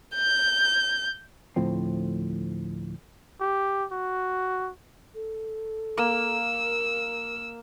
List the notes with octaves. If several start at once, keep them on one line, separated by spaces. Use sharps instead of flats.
G6
D2 A2 F3 C4
G4
F#4
A4
A#3 E6
A#4